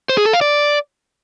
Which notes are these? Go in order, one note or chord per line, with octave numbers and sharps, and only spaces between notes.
C5
G#4
A4
F5
D5